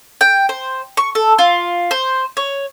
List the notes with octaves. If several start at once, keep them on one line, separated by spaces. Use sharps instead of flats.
G5
C5
C#6
A4
F4
C5
C#5